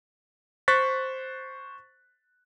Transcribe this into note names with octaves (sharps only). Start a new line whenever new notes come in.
C5 C#6 F#6 A6 B6